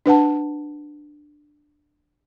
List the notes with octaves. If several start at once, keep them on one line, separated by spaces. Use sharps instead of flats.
D4 B4 F#5 A5